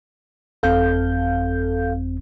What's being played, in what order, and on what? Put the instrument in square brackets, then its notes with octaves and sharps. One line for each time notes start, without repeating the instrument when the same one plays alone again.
[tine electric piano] G1 F2 C4 [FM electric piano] A4 F5 G6